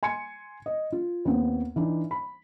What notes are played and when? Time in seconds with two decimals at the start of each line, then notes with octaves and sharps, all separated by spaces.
0.03 G#5 C6 G#6 C#7
0.66 D#5
0.92 F4
1.25 D#2 B3 C4
1.76 E3 D4 D#4
2.11 B5